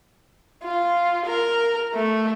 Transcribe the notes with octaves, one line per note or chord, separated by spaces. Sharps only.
F4
A#4
A3